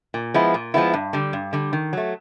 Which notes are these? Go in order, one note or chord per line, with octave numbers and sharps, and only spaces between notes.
A#2
F3 G#3 B3 E4
A#2
F3 G#3 B3 E4
G2
D3 G3
G2
D3 G3
D#3
F#3 A3